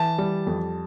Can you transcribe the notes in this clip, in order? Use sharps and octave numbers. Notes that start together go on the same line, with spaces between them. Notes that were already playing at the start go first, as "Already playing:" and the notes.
Already playing: E3 A5
G3
F2